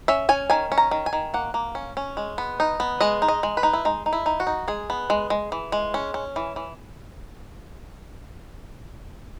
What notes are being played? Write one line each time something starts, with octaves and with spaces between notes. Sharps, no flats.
C#4 E5
C#4 G#5
D#3 G#5
C#4
A#5
D#3
G#5
D#3
A#3 F#5
A#3
C#4
C#4
G#3
B3
D#4
B3
G#3 D#5
D#4
D#5
G#3
B4
D#4
E4
G#3 D#4
D#4
E4
D#4
F#4
D#4
G#3 G#4
B3
G#3
G#3
E3
G#3
C#4
C#4
E3
E3